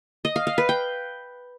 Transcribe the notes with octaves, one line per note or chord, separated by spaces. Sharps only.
D#5
F5
F5
B4
G5